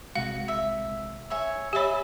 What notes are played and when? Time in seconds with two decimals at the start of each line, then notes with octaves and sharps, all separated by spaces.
0.15 A#1 C3 G#3 F#4 F5
0.48 E5
1.30 C#5 E5 G#5
1.73 G4 C#5 D#5 E5 G#5 B5